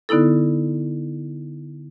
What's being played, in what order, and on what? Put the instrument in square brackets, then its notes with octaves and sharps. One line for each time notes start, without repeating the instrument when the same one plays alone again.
[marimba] D3 B3 D#4 E4 A4